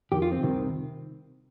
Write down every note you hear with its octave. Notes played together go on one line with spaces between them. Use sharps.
F2 D#3 G4
F4
C4
C2 C3 D#3